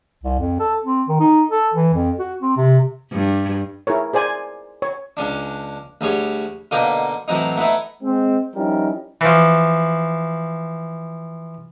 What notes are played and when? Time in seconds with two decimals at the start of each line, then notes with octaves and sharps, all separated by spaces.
0.23 C2
0.39 F2
0.59 A4
0.84 C4
1.08 D#3
1.20 D#4
1.51 A4
1.74 E3
1.93 F2
2.19 F#4
2.42 C4
2.57 C3
3.12 G2
3.87 E4 G#4 A#4 C#5
4.13 G#4 C5 D5 G#5
4.82 C#5
5.17 C#2 C#4 D4
6.01 D2 G3 G#4 C#5
6.71 B2 D3 A#3 D#4 G5
7.28 A2 E3 F#3 C4 D#4
7.57 A3 B3 D#4 E4
8.03 G#3 C4
8.56 F3 G3 C#4 D#4 E4 A#4
9.21 E3 F3